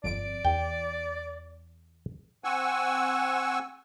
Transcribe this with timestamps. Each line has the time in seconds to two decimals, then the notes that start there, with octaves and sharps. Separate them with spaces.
0.04 G1 F2 D5 D7
0.45 E2 G5
2.44 C4 F#5 G#5 C#6 E6